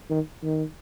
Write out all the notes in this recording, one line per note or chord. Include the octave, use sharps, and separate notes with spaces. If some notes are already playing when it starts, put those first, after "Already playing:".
D#3
D#3